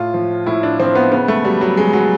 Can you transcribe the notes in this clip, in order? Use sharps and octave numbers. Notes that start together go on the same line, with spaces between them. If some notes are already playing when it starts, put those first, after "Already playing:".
Already playing: A2 F4
F3
A2 E4
D4
F3 C4
B3
C#3 B3
A3
F#3 G3
F#3
C#3 G#3
F#3